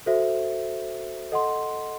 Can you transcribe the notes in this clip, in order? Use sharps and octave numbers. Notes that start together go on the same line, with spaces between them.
F#4 A4 C5 E5
A4 D#5 F#5 C6